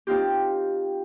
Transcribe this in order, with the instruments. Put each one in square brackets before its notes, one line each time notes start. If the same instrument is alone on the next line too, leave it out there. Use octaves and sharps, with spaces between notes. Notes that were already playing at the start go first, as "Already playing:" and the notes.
[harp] C4 D#4 F4 G4